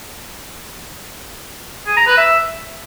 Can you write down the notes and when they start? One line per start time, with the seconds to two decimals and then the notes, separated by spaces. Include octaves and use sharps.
1.87 G#4
1.97 A#5
2.07 B4
2.17 E5